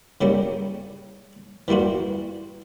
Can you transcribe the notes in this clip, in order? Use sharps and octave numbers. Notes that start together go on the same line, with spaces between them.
C#3 G3 A#3 C#4
E3 G3 A#3 F4 F#4